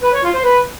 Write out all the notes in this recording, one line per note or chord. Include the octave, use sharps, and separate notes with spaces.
B4
C#5
F4
C5
B4